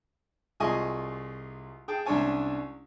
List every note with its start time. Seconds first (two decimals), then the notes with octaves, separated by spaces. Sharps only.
0.60 C2 F4 G#4 D#5 G#5 C#6
1.88 G#4 G5 A5
2.06 C2 C#4 D4 C#5 G#5 A5